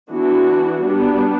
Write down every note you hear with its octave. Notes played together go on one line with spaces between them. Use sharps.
E3 B3 D4 F#4
G3 B3 D4